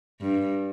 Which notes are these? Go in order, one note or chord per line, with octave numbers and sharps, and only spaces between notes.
G2